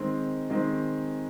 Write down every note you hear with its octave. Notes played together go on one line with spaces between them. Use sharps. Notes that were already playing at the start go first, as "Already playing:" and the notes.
Already playing: D#3 G#3 C4
D#3 G#3 C4